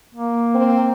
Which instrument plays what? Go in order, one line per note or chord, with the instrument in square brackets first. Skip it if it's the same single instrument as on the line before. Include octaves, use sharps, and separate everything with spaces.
[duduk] A#3
[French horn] C4